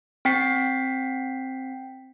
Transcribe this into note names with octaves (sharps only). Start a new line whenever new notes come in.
C4 G5 B6 C7